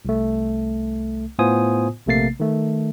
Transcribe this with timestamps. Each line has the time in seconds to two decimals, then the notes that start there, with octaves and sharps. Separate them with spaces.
0.05 C2 A3
1.39 A2 B3 F4 C5 G#5 D#6
2.06 A#1 C3 A3 A#3 A6 C7
2.40 D#3 A3